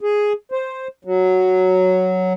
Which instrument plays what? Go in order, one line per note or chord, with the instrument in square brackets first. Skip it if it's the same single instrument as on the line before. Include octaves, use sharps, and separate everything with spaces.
[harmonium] G#4
C5
F#3